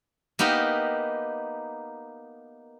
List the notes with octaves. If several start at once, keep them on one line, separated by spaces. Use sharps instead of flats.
A#3 B3 D#4 G4 A#4 B4